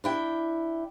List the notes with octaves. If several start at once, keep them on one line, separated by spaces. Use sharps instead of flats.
D4 E4 G5